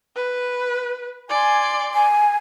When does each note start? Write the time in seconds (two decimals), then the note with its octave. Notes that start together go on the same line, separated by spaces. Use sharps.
0.16 B4
1.30 D5 G#5 C6
1.94 G#5